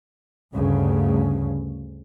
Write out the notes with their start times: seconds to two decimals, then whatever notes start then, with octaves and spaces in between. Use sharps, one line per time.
0.54 D2 G2 C#3